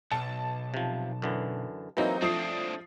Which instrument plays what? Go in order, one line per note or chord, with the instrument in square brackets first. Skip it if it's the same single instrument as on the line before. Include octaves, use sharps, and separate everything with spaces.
[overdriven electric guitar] B1 [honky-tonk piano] A5
[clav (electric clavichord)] C3 F3
F#2 D3 E3
[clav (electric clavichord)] E3 A#3 [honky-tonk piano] F#3 C4 D#4
[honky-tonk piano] F3 D#6 C7 [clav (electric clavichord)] A3 [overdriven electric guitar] C4 D4